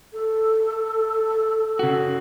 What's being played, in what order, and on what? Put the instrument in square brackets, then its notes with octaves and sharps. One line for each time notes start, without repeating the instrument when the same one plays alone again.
[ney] A4
[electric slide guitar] C#3 F#4